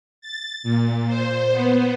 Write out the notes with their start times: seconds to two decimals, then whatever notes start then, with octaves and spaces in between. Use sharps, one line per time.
0.21 A6
0.63 A#2
1.07 C5
1.52 B3